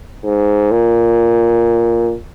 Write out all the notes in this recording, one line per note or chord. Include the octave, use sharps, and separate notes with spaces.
G#2
A#2